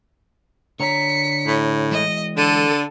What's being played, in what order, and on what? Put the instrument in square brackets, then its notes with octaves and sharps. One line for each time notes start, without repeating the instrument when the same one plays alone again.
[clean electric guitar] D3 C#5 A#5 [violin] B6 C#7
[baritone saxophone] A2
[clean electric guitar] E3 G#3 [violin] D#5
[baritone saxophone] D3 [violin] A4 D#7